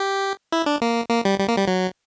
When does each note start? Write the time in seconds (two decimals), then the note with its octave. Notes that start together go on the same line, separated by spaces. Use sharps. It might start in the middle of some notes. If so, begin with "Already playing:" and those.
Already playing: G4
0.52 E4
0.66 D4
0.82 A#3
1.10 A#3
1.25 G3
1.39 G3
1.48 A#3
1.58 G3
1.68 F#3